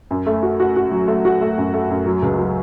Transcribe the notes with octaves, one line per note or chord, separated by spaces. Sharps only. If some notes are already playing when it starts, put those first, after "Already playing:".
F#2
A3
F#4
F#4
F#4
F#3
A3
F#4
A3
F#2
A3
F#2
F#3
C#2
F#3